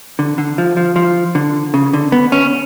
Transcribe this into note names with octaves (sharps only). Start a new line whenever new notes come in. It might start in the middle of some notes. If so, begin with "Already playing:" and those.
D3
D3
F3
F3
F3
D3
C#3
D3
B3
C#4